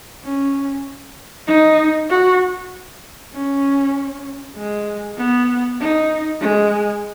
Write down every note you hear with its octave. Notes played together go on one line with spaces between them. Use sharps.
C#4
D#4
F#4
C#4
G#3
B3
D#4
G#3